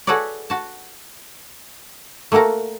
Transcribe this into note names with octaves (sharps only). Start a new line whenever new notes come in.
F#4 G#4 A4 B4 C#5 D5
F#4 A5
A3 A#3 F#4 A4 A#4